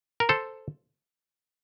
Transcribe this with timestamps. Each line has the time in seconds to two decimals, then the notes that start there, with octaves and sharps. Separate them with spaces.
0.20 A#4
0.29 A4 C5